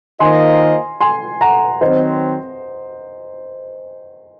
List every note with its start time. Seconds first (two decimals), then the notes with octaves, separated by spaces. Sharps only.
0.20 D#3 A#3 F4 C5 D#5 G#5 C6
1.01 G#5 C6
1.41 F#5 A#5
1.81 D#3 F#3 C4 C5 D#5